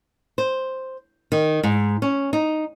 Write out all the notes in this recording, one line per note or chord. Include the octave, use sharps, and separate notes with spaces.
C5
D#3
G#2
C#4
D#4